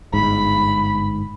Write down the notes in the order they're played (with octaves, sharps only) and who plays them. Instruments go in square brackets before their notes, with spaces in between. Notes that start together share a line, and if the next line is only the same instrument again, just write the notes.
[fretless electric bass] G1 G#2 [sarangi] B5